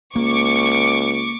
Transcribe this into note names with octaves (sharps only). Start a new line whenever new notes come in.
C#2 A#3 C#6 D6